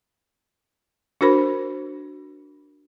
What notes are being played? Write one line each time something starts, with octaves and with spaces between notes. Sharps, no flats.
D4 F#4 A#4 C5 B5